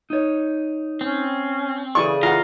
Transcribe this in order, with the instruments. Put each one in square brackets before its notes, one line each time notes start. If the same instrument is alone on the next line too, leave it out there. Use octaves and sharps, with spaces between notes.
[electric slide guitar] D#4 C#5
[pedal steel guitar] C4 [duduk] C#4
[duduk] C#3 [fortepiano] E3 C#6 [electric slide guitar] G#4 A4 D5
[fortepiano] E3 F#5 [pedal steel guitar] F4 A#5